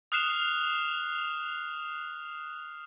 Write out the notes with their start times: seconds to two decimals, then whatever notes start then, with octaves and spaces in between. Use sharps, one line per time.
0.12 D#6 F6 F#6 C7 E7 F7